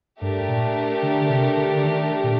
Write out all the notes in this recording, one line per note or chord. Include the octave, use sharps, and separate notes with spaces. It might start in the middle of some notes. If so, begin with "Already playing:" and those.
G2 A3 D4 G4 A#4
A#2
D3
C3
D3
D#3
A#2